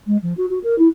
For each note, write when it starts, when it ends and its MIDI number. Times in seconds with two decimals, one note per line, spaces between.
0.06 0.17 56
0.22 0.33 53
0.37 0.45 66
0.49 0.58 66
0.63 0.77 70
0.78 0.87 64